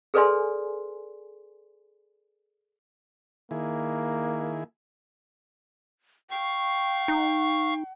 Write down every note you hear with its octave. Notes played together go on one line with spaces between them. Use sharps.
G#4 A4 B4 D5 G#5 C6
D#3 A#3 E4 G#4
F5 G5 C#6
D#4